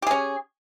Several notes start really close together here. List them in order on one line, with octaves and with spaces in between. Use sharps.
G4 G#4 C#4